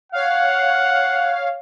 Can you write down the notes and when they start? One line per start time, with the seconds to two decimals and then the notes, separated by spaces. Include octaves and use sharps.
0.12 C#5 F5 F#5